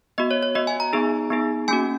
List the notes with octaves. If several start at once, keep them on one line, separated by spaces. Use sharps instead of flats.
B3 F#4 D#5
C#5
C#5
B3 F#4 D#5
G#5
A#5
B3 D#4 G#4
B3 D#4 G#4
A#3 C#4 F#4 G#5